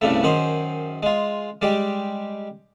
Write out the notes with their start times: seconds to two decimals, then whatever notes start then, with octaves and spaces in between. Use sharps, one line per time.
0.01 C2 G2 C#3 A3
0.23 F#2 D#3 G#4 C5
1.03 G#3 F4
1.62 G3 G#3 G4